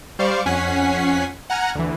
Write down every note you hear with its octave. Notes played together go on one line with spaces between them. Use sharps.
G3 C5 D5 F5 C#6
F2 C#4 F#5 G#5 B6 C7
F#5 G#5 A#5 F6 G#6
D2 E3